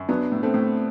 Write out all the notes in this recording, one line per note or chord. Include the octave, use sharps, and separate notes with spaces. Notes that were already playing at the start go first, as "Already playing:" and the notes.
Already playing: F#2
F#3 B3 D4
A2
A3 C4
A2